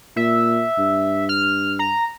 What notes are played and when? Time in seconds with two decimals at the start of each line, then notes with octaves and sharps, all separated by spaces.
0.16 A#2 E5
0.78 G2
1.29 F6
1.79 A#5